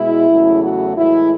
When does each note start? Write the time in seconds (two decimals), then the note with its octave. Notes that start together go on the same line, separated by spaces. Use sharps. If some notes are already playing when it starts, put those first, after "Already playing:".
Already playing: B2 G#3 E4
0.30 E2 C#3 F#3 A3
0.63 F#4
0.96 A2 E3 G#3 E4